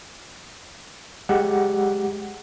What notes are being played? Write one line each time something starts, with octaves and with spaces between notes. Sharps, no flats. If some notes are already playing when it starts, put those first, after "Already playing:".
G#3 G4 F#5